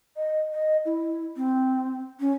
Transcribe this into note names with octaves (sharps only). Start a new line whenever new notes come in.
D#5
D#5
E4
C4
C#4